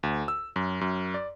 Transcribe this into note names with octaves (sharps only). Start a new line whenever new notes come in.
D2
E6
F#2
F#2
D5